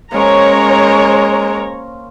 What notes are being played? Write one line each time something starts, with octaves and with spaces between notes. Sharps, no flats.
G#3 A#3 C#4 A#4 C5 C#5 A#5